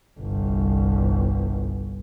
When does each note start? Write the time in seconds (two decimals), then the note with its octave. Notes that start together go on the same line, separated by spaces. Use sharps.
0.20 G1 C2